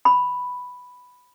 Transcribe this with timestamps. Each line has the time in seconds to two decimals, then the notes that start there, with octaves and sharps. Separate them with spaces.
0.05 B5